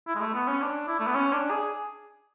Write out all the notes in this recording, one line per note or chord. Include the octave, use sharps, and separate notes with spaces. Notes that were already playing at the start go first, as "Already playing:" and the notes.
E4
G#3
A3
B3
C#4
D4
E4
A3
B3
C#4
D4
G#4